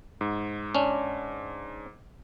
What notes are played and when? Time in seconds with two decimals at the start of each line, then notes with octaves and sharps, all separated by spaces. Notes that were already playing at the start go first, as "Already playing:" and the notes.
0.21 G#2
0.75 C#4 D4